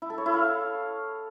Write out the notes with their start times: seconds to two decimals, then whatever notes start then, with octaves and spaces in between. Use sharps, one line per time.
0.02 E4
0.10 A4
0.18 C#5
0.26 E4
0.34 F5